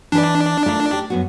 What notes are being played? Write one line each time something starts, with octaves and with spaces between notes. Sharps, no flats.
E3 D4 B4
A3 F4 A#4
G4
F#2 B3 F#4